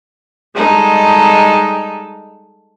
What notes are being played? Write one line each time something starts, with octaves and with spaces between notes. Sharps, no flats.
G3 G#3 D#4 A4